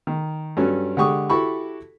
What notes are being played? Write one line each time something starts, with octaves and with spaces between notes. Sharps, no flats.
D#3
G2 F#3 C#4 A4
D3 G#3 G4 C#6 D#6
E4 F#4 G4 A4 B5 C#6